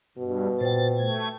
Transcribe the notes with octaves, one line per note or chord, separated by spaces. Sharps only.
G2 B2
A#2 C5 G5 A6
A3 G#6